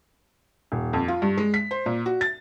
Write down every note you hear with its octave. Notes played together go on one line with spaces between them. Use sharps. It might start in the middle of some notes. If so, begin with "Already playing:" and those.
D#1
F2
F4
G2
G#3
B6
C5
A#2
F#4
A6